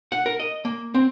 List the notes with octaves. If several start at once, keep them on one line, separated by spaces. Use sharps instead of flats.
F#5
A#4
D#5
A#3
C4